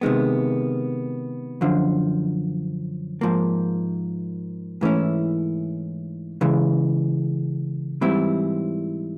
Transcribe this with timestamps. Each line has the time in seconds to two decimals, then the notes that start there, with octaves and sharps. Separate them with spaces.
0.01 C3 D#3 G#3 B3
1.61 F#2 D3 F3
3.21 G#2 F3 A#3
4.81 G#2 E3 A3 C#4 E4
6.41 C#3 E3 G#3
8.01 G#2 E3 G3 C4 E4